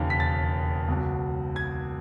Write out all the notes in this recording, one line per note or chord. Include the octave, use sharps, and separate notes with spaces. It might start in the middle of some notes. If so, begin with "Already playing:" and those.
Already playing: E1 D#2 C#3
B6
A6
C#2 B2 F#3
G#6